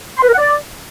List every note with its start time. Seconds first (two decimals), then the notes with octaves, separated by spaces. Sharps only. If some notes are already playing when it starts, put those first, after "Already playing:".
0.17 C6
0.23 B4
0.28 A#4
0.33 F#5
0.38 D5